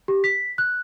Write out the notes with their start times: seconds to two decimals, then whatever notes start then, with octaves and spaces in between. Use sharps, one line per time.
0.08 G4
0.24 B6
0.58 F#6